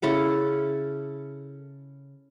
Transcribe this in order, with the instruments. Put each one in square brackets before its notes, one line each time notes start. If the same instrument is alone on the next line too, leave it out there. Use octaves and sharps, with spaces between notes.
[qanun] C#3 E4 A4 F#5